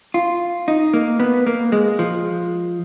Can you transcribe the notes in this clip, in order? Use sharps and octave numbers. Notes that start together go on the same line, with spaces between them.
F4
D#4
A#3
B3
A#3
G#3
F3